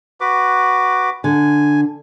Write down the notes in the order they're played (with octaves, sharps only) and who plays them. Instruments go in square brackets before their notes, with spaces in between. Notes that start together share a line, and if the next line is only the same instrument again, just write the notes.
[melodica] F#4 B4 D6
[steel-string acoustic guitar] D3 [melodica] G#5